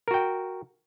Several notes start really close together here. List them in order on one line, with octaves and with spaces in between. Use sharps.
A#4 F#4 G5